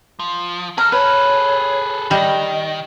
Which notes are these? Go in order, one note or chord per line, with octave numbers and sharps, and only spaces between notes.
F3
G#4 A4 A#5 F6
B4 C#5
D#3 G3 D#5